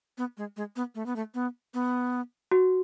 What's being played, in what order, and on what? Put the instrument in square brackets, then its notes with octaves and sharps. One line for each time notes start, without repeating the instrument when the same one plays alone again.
[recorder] B3
G#3
G#3
B3
A3
B3
A3
B3
B3
[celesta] F#4